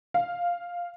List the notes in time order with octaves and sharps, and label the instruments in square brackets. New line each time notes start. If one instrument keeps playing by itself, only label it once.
[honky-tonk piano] F5